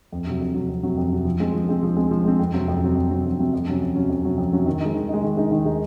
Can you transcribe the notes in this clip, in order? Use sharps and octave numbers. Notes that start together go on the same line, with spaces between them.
F2
C3 F#3
F2
C3 F#3
F2
C3 F#3
F2
C3 F#3
F3
G#3 C4
F3
G#3 C4
F3
G#3 C4
F3
G#3 C4
F2
C3 F#3 C4
F2
C3 F#3 C4
F2
C3 F#3 C4
F2
C3 F#3 C4
F2
C3 F#3 C#4
F2
C3 F#3 C#4
F2
C3 F#3 C#4
F2
C3 F#3 C#4
D#3
G#3 D#4
D#3
G#3 D#4
D#3
G#3 D#4
D#3
G#3 D#4